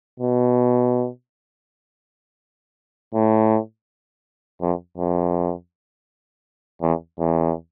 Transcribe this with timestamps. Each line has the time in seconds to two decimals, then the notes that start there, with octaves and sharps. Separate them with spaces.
0.20 B2
3.14 A2
4.61 F2
4.98 F2
6.82 E2
7.19 E2